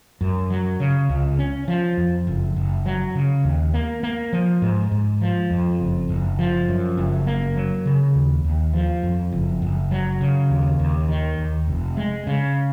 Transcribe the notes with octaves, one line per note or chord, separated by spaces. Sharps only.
F#2
F#3
C#3
C#2
C#4
F3
F2
F#1
F#1
F#3
C#3
D#2
A#3
A#3
F3
G#2
G#2
F3
F2
F#1
F#1
F3
F#2
F#1
A#3
F#3
C#3
D#2
D#2
F3
F2
F#1
F#1
F#3
C#3
D#2
D#2
D#3
D#2
F1
G#3
C#3